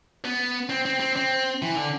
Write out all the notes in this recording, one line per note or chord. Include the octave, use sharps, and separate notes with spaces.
B3
C4
C4
C4
C4
E3
D3